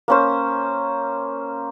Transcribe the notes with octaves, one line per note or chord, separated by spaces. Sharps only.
A#3 C#4 C5